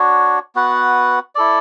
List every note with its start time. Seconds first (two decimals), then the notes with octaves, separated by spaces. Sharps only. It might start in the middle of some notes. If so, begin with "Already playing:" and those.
Already playing: D4 F#4 C#5
0.55 B3 F#4 B4 F#5
1.35 E4 A4 D5